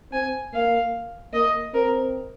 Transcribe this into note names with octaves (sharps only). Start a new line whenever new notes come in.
C4 G#5
A#3 F5
A#3 D#5
C4 A#4